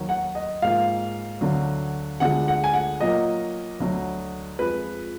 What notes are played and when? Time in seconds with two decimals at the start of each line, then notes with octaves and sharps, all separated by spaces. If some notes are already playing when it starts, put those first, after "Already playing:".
Already playing: D#2 D#3 F#3
0.09 F#5
0.35 D#5
0.62 G#2 F3 A#3 F5
1.41 D2 D3 F#3
2.20 D2 D3 F3 G#3 F#5
2.48 F#5
2.64 G#5
2.74 F#5
3.00 A#2 F#3 A#3 D#5
3.80 D2 D3 F#3
4.59 F2 F3 G#3 B4